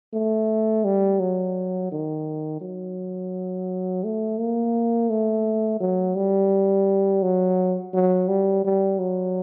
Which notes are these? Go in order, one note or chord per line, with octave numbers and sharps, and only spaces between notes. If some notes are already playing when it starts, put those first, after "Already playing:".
A3
G3
F#3
D#3
F#3
A3
A#3
A3
F#3
G3
F#3
F#3
G3
G3
F#3